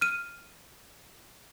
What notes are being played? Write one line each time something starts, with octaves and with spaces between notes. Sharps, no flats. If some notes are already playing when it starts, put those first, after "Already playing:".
F6 D#7